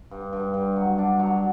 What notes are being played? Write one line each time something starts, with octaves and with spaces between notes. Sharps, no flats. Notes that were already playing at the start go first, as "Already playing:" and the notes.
G2
G2
G2
F#3
D4
F#3